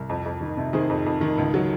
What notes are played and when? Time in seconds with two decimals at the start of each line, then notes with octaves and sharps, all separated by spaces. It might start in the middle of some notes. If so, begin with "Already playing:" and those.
Already playing: C2
0.09 F2
0.26 F2
0.41 D#3
0.57 C3
0.73 D#3 G#4 C5
0.90 F2
1.06 F2
1.21 D#3
1.38 C#2
1.54 F#3